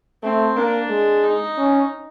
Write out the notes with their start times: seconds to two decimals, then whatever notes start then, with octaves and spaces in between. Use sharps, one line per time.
0.23 A3 C4
0.57 A#3 D4
0.89 G#3
1.23 D#4
1.57 C#4